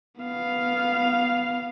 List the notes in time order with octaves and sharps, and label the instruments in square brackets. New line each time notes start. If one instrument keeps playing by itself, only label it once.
[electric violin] B3 F5